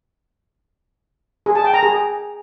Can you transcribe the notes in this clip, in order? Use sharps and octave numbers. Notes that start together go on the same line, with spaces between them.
G#4
A5
G5
A#5
G#4